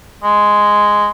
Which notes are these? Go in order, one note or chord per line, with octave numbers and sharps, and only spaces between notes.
G#3